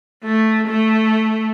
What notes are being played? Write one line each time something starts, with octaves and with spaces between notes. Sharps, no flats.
A3
A3